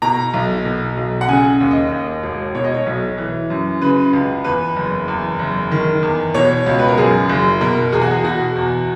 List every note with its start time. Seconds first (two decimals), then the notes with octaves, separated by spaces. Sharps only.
0.02 B2 A#5
0.34 B1
0.65 B2
0.97 B1
1.21 F#5
1.28 C#3 G#5
1.60 D#2
1.71 D#5
1.92 D#2
2.23 E1
2.55 B2 C#5
2.64 D#5
2.74 C#5
2.86 B1
3.18 E3
3.50 F#2
3.82 C#3 B4
4.13 C#2
4.44 E2 B4
4.76 F#1
5.08 E2
5.39 F#1
5.71 D#3
6.03 E2
6.34 B2 C#5
6.66 C#2
6.79 B4
6.88 A#4
6.97 F#2 G#4
7.29 F#1
7.61 B2 A#4
7.92 E2 G#4
8.01 F#4
8.11 G#4
8.24 B2 F#4
8.56 E2